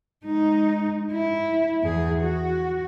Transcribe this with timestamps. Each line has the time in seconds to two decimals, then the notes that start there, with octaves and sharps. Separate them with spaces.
0.25 G#3 D#4
1.12 E4
1.83 E2 G#4
2.22 F#4